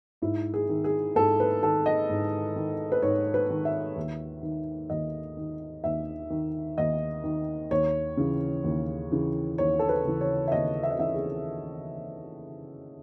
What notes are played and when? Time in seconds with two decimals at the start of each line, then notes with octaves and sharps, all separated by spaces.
0.22 G#2 E4
0.54 G#4
0.69 D#3
0.84 G#4
1.15 G#2 A4
1.40 B4
1.62 D#3 A4
1.86 D#5
2.09 G#2
2.56 D#3
2.92 B4
3.02 G#2 C#5
3.34 B4
3.50 D#3
3.65 E5
3.96 D#2
4.43 D#3
4.90 D#2 D#5
5.37 D#3
5.84 D#2 E5
6.30 D#3
6.78 D#2 D#5
7.24 D#3
7.71 D#2 C#5
8.17 C#3 E3
8.64 D#2
9.12 C#3 E3
9.58 D#2 C#5
9.79 A4
9.89 B4
10.05 C#3 E3
10.21 C#5
10.48 E5
10.52 D#2 D#5
10.83 E5
10.91 D#5
10.99 C#3 E3 E5
11.14 G#4